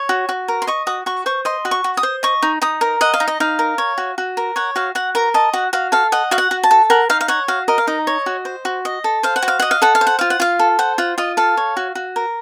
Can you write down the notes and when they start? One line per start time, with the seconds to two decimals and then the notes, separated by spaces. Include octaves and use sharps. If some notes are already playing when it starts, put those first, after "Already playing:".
Already playing: C#5
0.09 F#4
0.29 F#4
0.48 A#4
0.62 C6
0.67 D#5 C#6
0.87 F#4 D#6
1.06 F#4 C#6
1.26 C5 C#6
1.45 D#5 C6
1.65 F#4
1.71 C#6
1.84 F#4
1.97 D#6
2.03 C5
2.23 D#5 C#6
2.42 D#4
2.62 D#4 D#6
2.81 A#4
3.01 D#5 F#5
3.14 F5
3.20 D#4
3.28 D#5
3.40 D#4 F5
3.59 A#4
3.78 C#5
3.98 F#4
4.18 F#4
4.37 A#4
4.56 C#5 F#5
4.76 F#4 F5
4.95 F#4 F#5
5.15 A#4 A#5
5.34 D#5 A5
5.53 F#4 F#5
5.73 F#4 F5
5.92 A4 F5
6.12 D#5 F#5
6.31 F#4 F5
6.38 F#5
6.51 F#4
6.63 A5
6.71 A4
6.90 A#4 F#5
7.10 D#4 F5
7.21 F5
7.28 C#5 F#5
7.48 F#4 F5
7.68 A#4 D#5
7.78 F5
7.87 D#4 D#5
8.07 C#5
8.26 F#4
8.45 C5
8.65 F#4
8.85 D#5
9.04 A4
9.23 C5 F5
9.36 F#5
9.42 F#4
9.48 F5
9.60 D#5 F#5
9.71 F5
9.82 A4 F#5
9.95 F5
10.01 C5
10.07 F#5
10.19 F4 F5
10.30 F#5
10.40 F4 F5
10.59 A4
10.79 C5 F#5
10.98 F4 F#5
11.18 F4 D#5
11.37 A4 F5
11.57 C#5
11.77 F#4
11.95 F#4
12.16 A#4